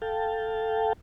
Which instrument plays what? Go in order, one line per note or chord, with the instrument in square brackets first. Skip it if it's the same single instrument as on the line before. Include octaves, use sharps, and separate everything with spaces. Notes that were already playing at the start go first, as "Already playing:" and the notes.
[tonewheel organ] A4 F5 G5 A5